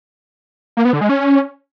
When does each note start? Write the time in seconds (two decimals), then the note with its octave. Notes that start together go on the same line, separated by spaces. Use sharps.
0.77 A#3
0.85 B3
0.93 D3
1.01 G#3
1.09 C#4